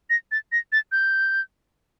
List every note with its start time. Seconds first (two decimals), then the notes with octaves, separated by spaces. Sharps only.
0.10 A#6
0.31 A6
0.52 A#6
0.72 A6
0.92 G6